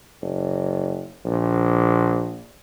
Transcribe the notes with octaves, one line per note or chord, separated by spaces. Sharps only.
F#1
A#1